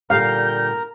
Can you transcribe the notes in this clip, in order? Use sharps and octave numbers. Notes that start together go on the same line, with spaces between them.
A#2 D3 G3 A#4 F5 A#5 G6